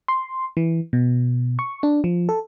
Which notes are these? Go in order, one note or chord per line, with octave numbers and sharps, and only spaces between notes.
C6
E3
B2
C#6
D4
F3
A4